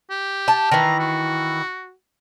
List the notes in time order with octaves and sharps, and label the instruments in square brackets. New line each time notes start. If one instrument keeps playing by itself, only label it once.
[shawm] G4
[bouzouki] A5
[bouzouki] D#3 E3 [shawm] A#5
[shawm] F#4